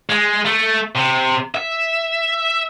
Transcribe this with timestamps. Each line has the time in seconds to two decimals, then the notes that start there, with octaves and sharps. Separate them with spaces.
0.10 G#3
0.45 A3
0.95 C3
1.55 E5